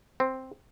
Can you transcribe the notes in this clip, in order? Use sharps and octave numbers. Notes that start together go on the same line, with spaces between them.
C4